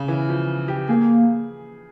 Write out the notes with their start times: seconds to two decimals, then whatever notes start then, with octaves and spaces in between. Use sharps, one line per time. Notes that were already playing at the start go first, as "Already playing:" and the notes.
Already playing: C#3
0.08 E3
0.29 F3
0.68 G4
0.88 A#3 G#4